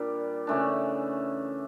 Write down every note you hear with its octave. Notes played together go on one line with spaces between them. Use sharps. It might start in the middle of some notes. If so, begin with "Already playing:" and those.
Already playing: A#2 G3 D4
C#3 E3 A3 D4